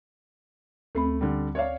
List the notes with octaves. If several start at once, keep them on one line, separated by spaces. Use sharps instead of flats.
D2 A3 C4 B5
D3 G3
C#5 D5 F5